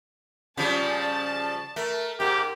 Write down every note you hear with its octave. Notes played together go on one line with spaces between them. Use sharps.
C#3 F3 G3 D5 A5
D5
A3 A#4
G#2 G4 A#4